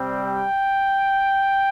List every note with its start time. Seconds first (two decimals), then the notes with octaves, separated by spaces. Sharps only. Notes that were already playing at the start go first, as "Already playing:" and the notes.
Already playing: C3 G3 C4
0.27 G5